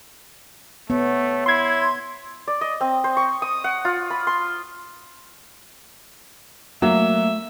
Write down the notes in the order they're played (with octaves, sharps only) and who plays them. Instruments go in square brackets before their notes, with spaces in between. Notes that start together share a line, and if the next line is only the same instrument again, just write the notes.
[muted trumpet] A3 [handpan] B3 [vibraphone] C#5
[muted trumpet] E4 [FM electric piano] C6 G#6
[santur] D5
D#5
C4
C5
C#6
D#6
F#5
F4
B5
C6
[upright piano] F#3 [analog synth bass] A3 [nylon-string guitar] A#3 [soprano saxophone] E5